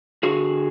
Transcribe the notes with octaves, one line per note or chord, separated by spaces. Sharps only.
D3 F#4 G#4